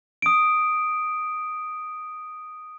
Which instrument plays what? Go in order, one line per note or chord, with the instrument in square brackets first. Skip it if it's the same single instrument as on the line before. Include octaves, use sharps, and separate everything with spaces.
[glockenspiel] D#6 D7